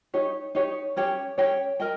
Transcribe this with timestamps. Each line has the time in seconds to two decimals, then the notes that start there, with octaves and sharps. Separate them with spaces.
0.14 D#4 G4 C#5
0.55 D#4 G4 C#5
0.96 C#4 G4 C#5 G5
1.38 C#4 G4 C#5 G5
1.80 A#4 D#5 G5